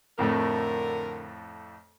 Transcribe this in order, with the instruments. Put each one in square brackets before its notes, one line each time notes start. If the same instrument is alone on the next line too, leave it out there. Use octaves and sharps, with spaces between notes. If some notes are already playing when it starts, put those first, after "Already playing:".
[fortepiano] F2 A2 A3 [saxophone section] D3 A#4